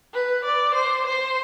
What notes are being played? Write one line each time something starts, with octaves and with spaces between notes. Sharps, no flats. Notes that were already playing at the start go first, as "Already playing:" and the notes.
B4
D5
C5
C5